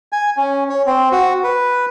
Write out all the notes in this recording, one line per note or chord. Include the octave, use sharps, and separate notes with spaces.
G#5
C#4
C#5
C4
F#4
B4